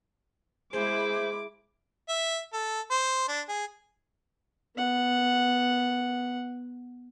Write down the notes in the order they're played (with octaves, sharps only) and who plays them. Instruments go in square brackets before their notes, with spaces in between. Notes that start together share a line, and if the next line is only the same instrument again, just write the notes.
[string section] G#3 E4 [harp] G#4 [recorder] C5 [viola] D6
[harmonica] E5
A4
C5
D4
G#4
[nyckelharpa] B3 F#5